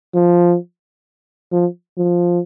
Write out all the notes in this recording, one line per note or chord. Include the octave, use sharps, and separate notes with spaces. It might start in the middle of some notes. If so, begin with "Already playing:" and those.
F3
F3
F3